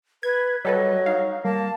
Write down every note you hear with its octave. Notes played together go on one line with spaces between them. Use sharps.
B4 G#6
F#3 G3 A4 B4 D#5
D#4 F5
G3 A#3 A5